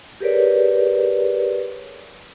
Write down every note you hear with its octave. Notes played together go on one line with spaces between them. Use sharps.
G4 G#4 A#4 B4 C#5 D5